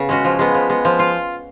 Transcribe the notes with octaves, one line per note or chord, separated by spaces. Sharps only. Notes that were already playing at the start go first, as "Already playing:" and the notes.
Already playing: C#3 B3
G#3 C#4 F#4
F3
G#3 B3
F3
G#3 B3
F3
F4